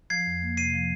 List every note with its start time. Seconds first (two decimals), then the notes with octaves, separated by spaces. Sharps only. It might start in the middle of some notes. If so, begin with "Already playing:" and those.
0.10 F3 G#6 C7
0.26 F2
0.42 A#3
0.57 C3 C7 D#7
0.73 F3